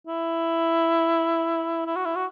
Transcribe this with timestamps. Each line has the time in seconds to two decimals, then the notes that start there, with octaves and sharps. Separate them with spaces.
0.07 E4
1.86 E4
1.96 F#4
2.05 E4
2.16 F#4